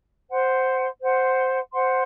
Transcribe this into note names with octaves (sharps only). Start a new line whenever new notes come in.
C5 F#5 C6
C5 F#5 C6
C5 F#5 C6